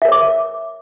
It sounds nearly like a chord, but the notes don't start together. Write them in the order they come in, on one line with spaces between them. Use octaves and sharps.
E5 A#4 C#5 D6